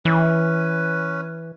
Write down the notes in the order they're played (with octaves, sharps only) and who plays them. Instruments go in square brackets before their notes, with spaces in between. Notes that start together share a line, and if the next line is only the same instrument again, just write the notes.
[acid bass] E3 [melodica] C#4 B4